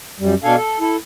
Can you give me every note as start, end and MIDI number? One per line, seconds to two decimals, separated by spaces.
0.20 0.34 42
0.20 0.34 55
0.44 0.56 47
0.44 0.56 62
0.44 0.56 69
0.44 0.56 77
0.44 0.56 80
0.56 0.79 69
0.80 0.96 64
0.80 0.96 69